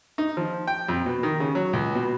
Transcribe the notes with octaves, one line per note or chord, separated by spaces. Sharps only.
D#4
F3
G5
F2
B2
D#3
C#3
F#3
C#2
B2